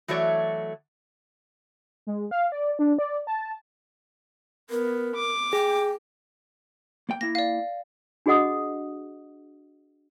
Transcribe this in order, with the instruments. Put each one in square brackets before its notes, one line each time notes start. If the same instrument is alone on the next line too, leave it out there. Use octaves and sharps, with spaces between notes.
[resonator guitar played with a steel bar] E3 F#3 A3 F#4 C#5 D5
[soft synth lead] G#3
F5
D5
D4
D5
A5
[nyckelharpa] B3 [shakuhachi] A#4
[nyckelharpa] D6
[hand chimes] G#4 [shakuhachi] G5
[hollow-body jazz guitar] A#3 G5
[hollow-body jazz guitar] A#3 E4 [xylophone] A#6
[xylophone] D5 F5
[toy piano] D4 F#4 G#4 D#5 F#5 D#6